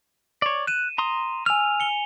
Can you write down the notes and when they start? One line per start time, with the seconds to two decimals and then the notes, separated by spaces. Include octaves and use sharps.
0.42 C#5 D5
0.67 F#6 D#7 E7
0.98 A#5 C6 D#6
1.46 G#5 E6 F6 F7
1.80 C#7 G7